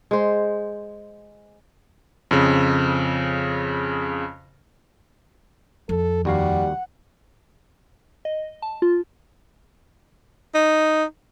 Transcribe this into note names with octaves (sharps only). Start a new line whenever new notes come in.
G#3 C5
F2 C#3
F2 A4
D#2 G3 F#4 F5 F#5
D#5
A5
F4
D#4